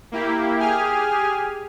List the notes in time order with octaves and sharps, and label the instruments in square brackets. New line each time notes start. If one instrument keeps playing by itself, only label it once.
[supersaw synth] A#3 E4 G4
G4 G#4 G#5 F6